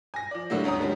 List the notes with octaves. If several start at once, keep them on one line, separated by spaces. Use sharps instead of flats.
G#5 A#6
F3 D5
A2 D3 F#3 G3 A3 A#3
G1 D2 C#4 A#5 D#6
D3 F3 G3 G#3 C#4